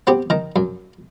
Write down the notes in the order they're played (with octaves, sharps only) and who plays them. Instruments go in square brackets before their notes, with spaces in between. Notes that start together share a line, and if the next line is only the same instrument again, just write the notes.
[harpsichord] B3 C4 G4
D#3 A#5
F#2